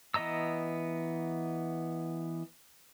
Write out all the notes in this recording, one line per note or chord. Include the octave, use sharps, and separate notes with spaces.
E3 B3 D#5 A#5 E6